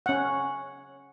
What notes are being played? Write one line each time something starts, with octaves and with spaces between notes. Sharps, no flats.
C#4 F#5